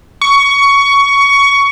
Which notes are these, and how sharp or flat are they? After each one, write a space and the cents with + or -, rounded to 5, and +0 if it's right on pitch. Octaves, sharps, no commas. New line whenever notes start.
C#6 +15